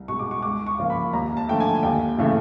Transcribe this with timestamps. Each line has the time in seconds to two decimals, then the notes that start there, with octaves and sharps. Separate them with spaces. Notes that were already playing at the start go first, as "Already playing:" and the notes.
Already playing: C2
0.08 B2 G#3 C#6
0.19 D6
0.31 C#6
0.42 C#2 D6
0.66 C#6
0.79 C#3 F3 A#3
0.90 B5
1.13 D#2 A#5
1.37 A5
1.48 D3 F3 A3 G5
1.60 G#5
1.83 D#2 G5
2.18 C#3 E3 A3